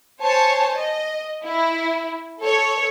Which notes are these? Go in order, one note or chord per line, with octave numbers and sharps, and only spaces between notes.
C5 C#5 G#5 A5
D#5
E4
A4 C#5